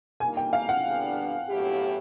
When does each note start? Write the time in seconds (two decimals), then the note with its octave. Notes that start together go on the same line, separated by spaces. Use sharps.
0.20 D#3 G3 A#3 D#4 G#5
0.37 G5
0.53 F5
0.69 F#5
0.85 D3 G3 B3 D4
1.48 A2 F#3 B3 E4 G4